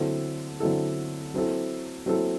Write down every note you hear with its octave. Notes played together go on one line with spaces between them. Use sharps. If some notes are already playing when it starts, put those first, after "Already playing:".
Already playing: D3 F#3 C4 E4 A4
D3 F#3 C4 E4 A4
F#3 C4 E4 A4
F#3 C4 E4 A4